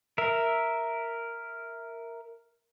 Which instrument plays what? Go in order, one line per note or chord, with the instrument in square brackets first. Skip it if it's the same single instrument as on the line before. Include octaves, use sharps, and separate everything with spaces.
[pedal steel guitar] A#4 E5